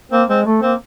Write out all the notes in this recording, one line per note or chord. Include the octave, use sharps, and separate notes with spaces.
A#3 C4
G#3 C4
A3
A#3 C4